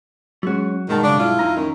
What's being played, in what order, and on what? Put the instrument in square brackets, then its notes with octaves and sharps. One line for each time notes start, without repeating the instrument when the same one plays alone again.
[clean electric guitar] F#3 F#4 [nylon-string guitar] G#3 C#4
[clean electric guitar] B1 G2 A5 [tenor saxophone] D#3 [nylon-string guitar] G#3 F#4
[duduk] C#3 [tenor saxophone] D4
[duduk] E4 [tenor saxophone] F4
[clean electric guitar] F2 D#4 A#5 [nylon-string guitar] G#5
[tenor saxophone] D#3 [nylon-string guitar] C#4